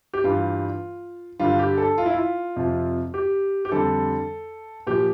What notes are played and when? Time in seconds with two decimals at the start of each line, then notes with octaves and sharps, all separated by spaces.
0.14 G4
0.24 G2 E3 G3 F4
1.39 G2 D3 G3 F4
1.59 G4
1.78 A4
1.98 F4
2.06 E4
2.13 F4
2.56 F2 C3 F3
3.14 G4
3.65 G4
3.72 F2 D3 G3 A4
4.87 A#2 F3 G4